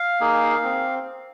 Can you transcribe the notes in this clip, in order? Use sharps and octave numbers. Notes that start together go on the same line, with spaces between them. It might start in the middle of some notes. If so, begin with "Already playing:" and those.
Already playing: F5
A#3 D#4 G#4
C4